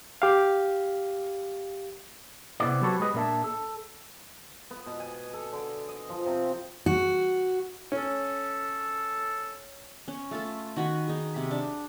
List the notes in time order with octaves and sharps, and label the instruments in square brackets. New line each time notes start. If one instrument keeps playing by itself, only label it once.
[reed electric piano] G4 F5
[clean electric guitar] C3 B3 C4 E4 D5
F#3 C4 G4 A4 B4 C#5
G#3 G4 B4 D#5
A#2 A#3 D4 E5 A5
A4
[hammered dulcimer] B3
B2
G#5
A4
D3
D#5
F3
C3
[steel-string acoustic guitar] F#4
[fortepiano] C#4 [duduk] A4
[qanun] C#4
A3 F4 A4
D#3 F#4 G#5 B5
D#4 G#4
C3 B5
D4